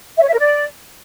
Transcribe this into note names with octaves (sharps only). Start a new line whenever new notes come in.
E5
C#5
E5
A#4
D5